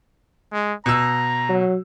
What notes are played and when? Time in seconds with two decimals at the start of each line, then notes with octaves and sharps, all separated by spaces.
0.53 G#3
0.86 B2 A#5 E6
1.49 F#3